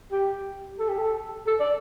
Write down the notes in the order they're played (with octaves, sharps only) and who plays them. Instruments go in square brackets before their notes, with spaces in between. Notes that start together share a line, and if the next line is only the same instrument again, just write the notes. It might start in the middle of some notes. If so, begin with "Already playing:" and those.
[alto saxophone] G4
A4
G4
A4
A4
D5